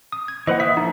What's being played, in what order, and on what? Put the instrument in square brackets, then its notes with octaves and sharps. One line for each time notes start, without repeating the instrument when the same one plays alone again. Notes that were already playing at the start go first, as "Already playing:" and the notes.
[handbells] D#6
G#6
[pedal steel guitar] E3 B4 F#5 [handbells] A#3 C5 D#5
[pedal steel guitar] E5 D#6 [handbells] B6
[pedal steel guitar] F3 A4 [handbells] D#4